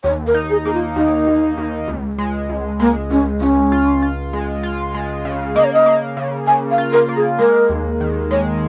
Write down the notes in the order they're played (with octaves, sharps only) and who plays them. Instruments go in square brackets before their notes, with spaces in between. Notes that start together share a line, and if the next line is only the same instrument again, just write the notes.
[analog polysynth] D#2 [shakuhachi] C#5
[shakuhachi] A#4
[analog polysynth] D#4
[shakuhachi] G#4
[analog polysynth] A#3 [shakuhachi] G#4
[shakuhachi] F4
[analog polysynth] D#2 [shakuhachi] D#4
[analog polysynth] D#2
D#2
C#2
G#3
C#2
[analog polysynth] G#3 [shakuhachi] A#3
[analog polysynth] C#2 [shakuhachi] C#4
[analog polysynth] C#2 [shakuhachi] C#4
[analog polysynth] F4
F4
G#3
F4
G#3
C#3
[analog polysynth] A#3 [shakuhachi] D#5
[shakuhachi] C#5
D#5
[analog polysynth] A#3
C#3
[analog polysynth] C#3 [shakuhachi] G#5
[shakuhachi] F5
[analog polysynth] F4
[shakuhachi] A#4
[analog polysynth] A#3
[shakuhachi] G#4
[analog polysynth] G#3 [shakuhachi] A#4
[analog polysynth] D#2
D#3
[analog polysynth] G#3 [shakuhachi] C#5